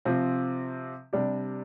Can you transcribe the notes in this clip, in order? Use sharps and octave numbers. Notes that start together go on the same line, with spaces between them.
C3 F3 C4
C3 G3 D4 G4